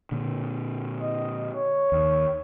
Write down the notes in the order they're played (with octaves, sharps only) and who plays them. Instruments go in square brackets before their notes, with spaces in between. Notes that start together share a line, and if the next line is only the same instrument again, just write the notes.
[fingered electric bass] A#2 D3
[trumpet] D#5
C#5
[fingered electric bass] D#2